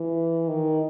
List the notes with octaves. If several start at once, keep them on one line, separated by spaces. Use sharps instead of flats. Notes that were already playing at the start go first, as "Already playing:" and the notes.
Already playing: E3
D#3